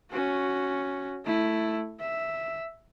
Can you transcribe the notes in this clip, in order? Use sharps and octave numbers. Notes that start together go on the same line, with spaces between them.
C#4 F#4
A3 E4
E5